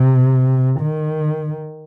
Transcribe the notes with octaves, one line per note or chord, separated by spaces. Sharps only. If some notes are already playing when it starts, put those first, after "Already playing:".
Already playing: C3
D#3